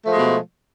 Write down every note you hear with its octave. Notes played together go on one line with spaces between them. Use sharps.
B2 F3 G#3 A3